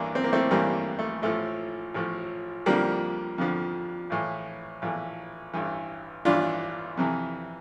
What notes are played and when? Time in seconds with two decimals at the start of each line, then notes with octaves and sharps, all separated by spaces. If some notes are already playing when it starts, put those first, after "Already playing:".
Already playing: A1 G2 E3 A#3 D4
0.15 C4
0.24 A#3
0.33 A3 C4
0.51 A1 G2 E3 G3 A#3
0.99 A3
1.22 A1 A2 F3 A3
1.94 A1 A2 F3
2.66 F2 D3 F3 G3 A#3
3.38 F2 D3 F3
4.10 A#1 A2 E3
4.82 A#1 A2 E3
5.53 A1 G2 E3
6.25 A1 G2 E3 D4 F4
6.97 F2 C3 E3